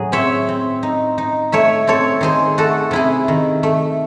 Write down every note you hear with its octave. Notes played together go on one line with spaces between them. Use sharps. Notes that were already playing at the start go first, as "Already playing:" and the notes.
Already playing: A2 F#3 G#4
C4 C#5 E5
C4
D#4
D#4
A3 C#5 E5
C4 A4 C#5
D#3 G#4 C5
A3 F#4 A4
C3 E4 G#4
D#3
A3